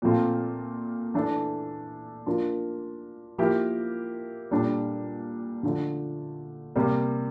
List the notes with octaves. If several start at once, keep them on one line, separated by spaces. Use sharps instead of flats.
A#2 F3 A3 C4 F4
E3 A3 D4 A4
F3 A#3 D4 F4 A#4
F3 A#3 E4 G4 A#4
A#2 G3 D4 A4
D3 F3 A3 D4
C3 G3 A#3